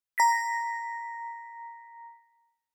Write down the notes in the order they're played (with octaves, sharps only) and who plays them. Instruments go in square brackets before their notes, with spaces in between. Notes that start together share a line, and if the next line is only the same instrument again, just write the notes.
[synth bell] A#5 A#6 B6